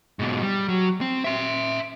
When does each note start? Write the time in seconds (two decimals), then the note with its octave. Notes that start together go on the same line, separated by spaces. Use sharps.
0.19 G#2 B2
0.42 G3
0.68 F#3
1.01 C4
1.24 E5 C6